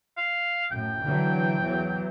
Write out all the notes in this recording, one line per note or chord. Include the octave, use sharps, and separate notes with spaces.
F5
F#2 A2 G5
D3 E3 F#3
E2 E3 F#3